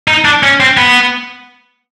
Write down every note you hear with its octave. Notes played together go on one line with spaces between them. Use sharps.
D#4
D4
C#4
C4
B3